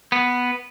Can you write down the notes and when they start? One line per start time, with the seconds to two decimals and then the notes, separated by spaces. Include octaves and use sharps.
0.12 B3